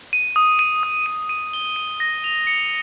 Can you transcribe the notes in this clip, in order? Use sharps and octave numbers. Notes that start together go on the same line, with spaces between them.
D#7
D#6
D#7
D#6
D#7
D#7
G7
D#7
A#6
F7
C#7